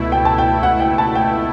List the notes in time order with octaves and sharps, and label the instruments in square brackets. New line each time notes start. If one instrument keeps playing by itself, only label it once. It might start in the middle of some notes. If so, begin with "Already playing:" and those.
Already playing: [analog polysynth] C#2 B2 A3 E4
[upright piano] G5
A5
G5
F#5
G5
A5
G5